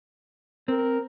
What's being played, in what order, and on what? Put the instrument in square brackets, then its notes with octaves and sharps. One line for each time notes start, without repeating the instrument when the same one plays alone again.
[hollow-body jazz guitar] C4 [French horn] A#4